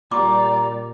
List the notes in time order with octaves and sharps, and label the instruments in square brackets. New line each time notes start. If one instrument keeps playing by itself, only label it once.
[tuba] A#2 [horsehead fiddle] G3 D5 [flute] A#5 [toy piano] C6 D6